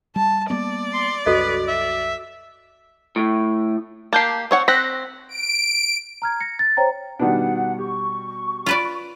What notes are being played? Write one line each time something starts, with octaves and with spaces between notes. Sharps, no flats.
G3 A5
G3 A#3 B3 D5
C6
C2 F#2 F#4 A4 B4 D#5
E5
A2
A#3 G4 A5 G6 C7
C4 C#5 F#5
C4 F#6 A#6 B6
D7
A#5 F6 G#6
A#6 C#7
A6
C5 C#5 G5 A#5
B2 D#3 G3 B3 D4 F#5
G4 C#6
F4 B4 D5